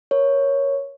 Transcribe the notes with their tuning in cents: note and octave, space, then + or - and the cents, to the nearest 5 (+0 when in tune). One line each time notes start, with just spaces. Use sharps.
A#4 +20 C#5 +0